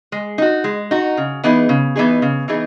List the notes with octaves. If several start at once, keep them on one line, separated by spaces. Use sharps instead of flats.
G#3
D#4 F#4
G#3
D#4 F#4
C#3
E3 B3 D#4 G#4
C#3
E3 B3 D#4 G#4
C#3
E3 B3 D#4 G#4